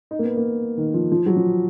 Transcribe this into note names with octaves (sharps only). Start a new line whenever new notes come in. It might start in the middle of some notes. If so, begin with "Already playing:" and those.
D#4
A#3
B3
A#3
D#3
F3
F3
F#3
F3